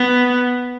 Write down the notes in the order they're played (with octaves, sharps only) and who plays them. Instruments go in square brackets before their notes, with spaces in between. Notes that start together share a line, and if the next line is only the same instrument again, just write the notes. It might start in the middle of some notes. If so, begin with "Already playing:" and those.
Already playing: [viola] B3